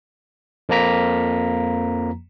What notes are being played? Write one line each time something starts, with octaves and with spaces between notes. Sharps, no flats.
F2 F3 A#3 A#5 B6